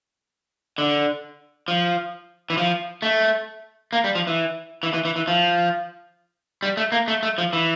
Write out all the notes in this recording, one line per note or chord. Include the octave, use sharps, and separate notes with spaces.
D3
F3
E3
F3
A3
A#3
G3
F3
E3
E3
E3
E3
E3
F3
G3
A3
A#3
A3
A3
F3
E3